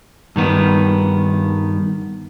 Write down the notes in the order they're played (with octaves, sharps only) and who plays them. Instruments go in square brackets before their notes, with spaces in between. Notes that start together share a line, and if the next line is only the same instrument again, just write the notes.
[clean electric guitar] G2 D#3 B3